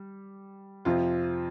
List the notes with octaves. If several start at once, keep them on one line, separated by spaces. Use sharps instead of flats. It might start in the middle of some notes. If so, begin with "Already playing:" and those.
Already playing: G3
F2 C3 F3 F4